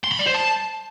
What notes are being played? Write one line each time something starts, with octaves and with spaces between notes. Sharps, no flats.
C6
B5
D5
C5
A5